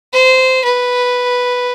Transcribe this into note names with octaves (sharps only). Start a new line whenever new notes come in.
C5
B4